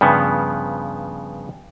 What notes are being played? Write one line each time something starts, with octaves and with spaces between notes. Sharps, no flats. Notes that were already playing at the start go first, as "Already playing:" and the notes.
G2 C#3 F3 B3